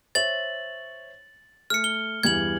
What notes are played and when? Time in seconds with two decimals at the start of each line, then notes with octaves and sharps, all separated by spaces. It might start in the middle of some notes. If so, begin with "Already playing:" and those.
0.15 C5 C#5 E5 A6 F#7
1.70 A3 F6 C#7
1.84 G7
2.23 E2 G2 E3 G#6 F#7